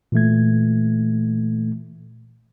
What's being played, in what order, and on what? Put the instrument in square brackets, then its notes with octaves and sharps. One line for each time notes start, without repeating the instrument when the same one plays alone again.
[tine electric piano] A#2 E3 A3 G#6